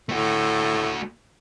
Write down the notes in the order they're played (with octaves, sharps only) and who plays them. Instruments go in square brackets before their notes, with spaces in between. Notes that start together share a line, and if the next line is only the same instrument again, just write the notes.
[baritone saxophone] A2 [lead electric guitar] A3 F#4